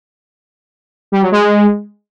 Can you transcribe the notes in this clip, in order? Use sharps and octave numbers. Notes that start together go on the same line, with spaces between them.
G3
F#3
G#3